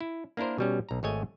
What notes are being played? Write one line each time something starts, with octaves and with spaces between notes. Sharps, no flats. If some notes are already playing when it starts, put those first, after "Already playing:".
E4
A#3 D4 E4 A#4 C5
B2 G3 C#4
B1 A#5
G#1 G#3 A3 C#5 D#5 G#5